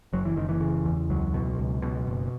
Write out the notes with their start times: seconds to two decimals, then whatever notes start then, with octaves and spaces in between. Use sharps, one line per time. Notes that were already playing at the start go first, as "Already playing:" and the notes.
0.13 F#1 F#3
0.25 E3
0.36 F#1 D#3
0.49 E3
0.61 C#3
0.85 E2
1.10 C#2 F#3
1.34 B2
1.58 C#2
1.82 B2
2.07 F#1